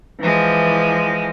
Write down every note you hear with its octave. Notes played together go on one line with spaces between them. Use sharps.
E3 F3 G#3